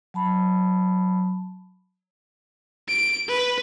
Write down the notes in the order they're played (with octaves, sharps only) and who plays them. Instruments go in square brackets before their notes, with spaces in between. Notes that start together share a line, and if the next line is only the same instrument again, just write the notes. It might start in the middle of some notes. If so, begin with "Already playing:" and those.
[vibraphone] F#3 A5 B5
[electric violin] D7
B4